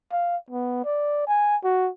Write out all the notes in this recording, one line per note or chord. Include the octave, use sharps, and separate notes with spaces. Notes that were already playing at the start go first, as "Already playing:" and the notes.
F5
B3
D5
G#5
F#4